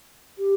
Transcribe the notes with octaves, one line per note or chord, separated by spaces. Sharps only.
G4